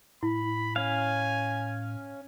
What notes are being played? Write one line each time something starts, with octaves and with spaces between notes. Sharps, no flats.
A2 E4 B5
C#4 F5 G#5